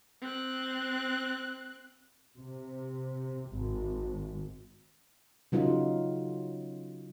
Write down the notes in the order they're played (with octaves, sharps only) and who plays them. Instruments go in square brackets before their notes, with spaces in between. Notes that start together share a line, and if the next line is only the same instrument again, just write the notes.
[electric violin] C4 F#6
[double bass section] C3
G#1
[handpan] C#3 F#3 D#4 F4